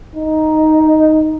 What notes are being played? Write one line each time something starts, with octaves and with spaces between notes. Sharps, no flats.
D#4